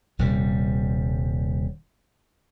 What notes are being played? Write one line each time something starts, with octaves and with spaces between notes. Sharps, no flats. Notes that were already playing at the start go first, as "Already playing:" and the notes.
D#1 C3 G3